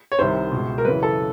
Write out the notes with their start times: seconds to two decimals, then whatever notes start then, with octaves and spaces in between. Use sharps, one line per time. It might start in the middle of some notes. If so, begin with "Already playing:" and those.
0.12 C#5
0.19 C2 C3 D#3 C5
0.52 C#2 B2
0.78 A#4
0.85 F#2 C#3 E3 B4
1.03 A4